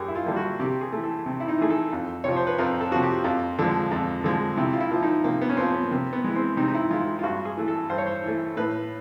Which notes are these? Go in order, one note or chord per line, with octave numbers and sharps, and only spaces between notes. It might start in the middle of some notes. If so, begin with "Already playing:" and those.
Already playing: F#2 A#3 G4 G#4
E4
F4
D3 G3 A#3
F#4
C3 G4
G#4
E3 A3
A4
C3
E4
D#4
E3 A3 G#4
A4
F2
C3 F3 C#5
C5
B4
F2 A#4
A4
C3 F3 F#4
G4
F2 F4
D3 F3 G#3
F2
D3 F3 G#3
C3 E4
F4
E4
F3 A#3
D#4
C3 A#3
B3
C#4
F3 A#3 C4
B3
C3 A#3
B3
E3 G#3
C4
C3 D#4
D#4
E4
E3 G#3 F4
F4
G2 F#4
G#4
E3 A3
A4
G2 C5
C#5
C5
E3 A3
A2 B4